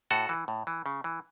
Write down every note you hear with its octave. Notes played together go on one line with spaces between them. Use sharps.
A2 F#4 A4
E3
A2
E3
C#3
E3